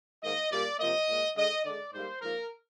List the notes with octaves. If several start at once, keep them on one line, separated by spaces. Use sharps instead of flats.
G#2 D#3 A#3 D#5
A#2 G3 A#3 D5
C3 F3 A#3 D#5
A#2 G#3
D3 G#3 D#5
D3 G#3 D5
G#2 G3 A#3 C5
G#2 F3 A#3 A#4